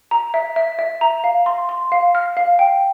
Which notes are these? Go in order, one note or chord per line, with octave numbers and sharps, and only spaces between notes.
A#5
E5
E5
E5
A#5
F5
C6
C6
F5
F6
F5
G5